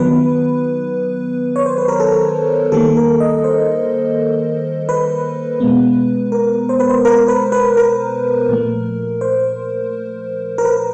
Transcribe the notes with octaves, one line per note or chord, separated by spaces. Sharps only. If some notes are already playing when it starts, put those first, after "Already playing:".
Already playing: D#3 F#3 B3 B4
C#5
C5
B4
A#4
A4
D#3 G3 A#3 A4
A#4
D#5
C5
B4
B2 G#3 B3
A#4
C5
B4
C5
A#4
B4
B4
A#4
A#2 F3 A3
C5
A#4
B4